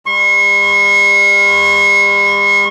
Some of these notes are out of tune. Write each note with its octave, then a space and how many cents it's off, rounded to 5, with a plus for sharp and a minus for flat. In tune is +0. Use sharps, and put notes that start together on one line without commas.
G3 +40 C#6 -40